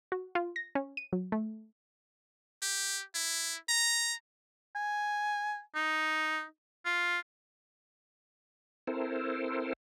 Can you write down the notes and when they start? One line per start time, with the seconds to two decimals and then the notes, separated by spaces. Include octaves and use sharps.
0.12 F#4
0.35 F4
0.56 A#6
0.75 C#4
0.97 D#7
1.13 F#3
1.32 A3
2.62 G4
3.14 E4
3.69 A#5
4.75 G#5
5.75 D#4
6.85 F4
8.87 C4 E4 A4 A#4 C5